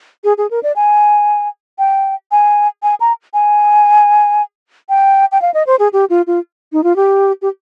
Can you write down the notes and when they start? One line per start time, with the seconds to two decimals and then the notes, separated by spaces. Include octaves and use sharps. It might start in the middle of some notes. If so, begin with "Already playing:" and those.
0.24 G#4
0.38 G#4
0.51 A#4
0.63 D5
0.76 G#5
1.79 G5
2.31 G#5
2.83 G#5
3.00 A#5
3.34 G#5
4.89 G5
5.32 G5
5.42 F5
5.54 D#5
5.67 C5
5.79 G#4
5.93 G4
6.10 F4
6.27 F4
6.73 D#4
6.84 F4
6.96 G4
7.42 G4